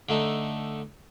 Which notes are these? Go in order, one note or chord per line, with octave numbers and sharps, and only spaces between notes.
D3 A3 D#4